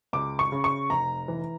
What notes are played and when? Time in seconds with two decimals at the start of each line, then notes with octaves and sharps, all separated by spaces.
0.13 C#2 D6
0.39 C#6
0.52 C#3
0.64 C#6
0.90 F1 A#5
1.28 E3